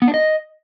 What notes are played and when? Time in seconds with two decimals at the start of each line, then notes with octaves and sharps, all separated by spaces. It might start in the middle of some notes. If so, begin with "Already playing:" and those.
0.02 B3
0.08 D4
0.14 D#5